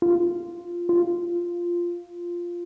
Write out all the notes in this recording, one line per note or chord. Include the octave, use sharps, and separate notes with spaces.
F4
F4